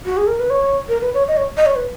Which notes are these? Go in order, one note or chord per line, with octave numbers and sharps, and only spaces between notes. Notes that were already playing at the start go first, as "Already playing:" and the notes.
F#4
G#4
A#4
B4
C#5
A#4
B4
C#5
D#5
C#5
D#5
C#5
B4